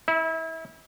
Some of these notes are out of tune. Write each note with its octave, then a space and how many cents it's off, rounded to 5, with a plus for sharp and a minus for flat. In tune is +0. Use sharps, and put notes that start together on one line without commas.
E4 -30 E5 +0